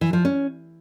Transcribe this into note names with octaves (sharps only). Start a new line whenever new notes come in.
E3
F3
C#4